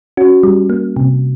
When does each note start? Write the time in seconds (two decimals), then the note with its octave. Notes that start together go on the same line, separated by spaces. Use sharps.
0.17 C#4 F#4
0.43 G3
0.70 A#3
0.96 C3